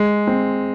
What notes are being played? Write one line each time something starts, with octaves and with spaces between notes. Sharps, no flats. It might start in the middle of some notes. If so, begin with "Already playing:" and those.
Already playing: G#3
C4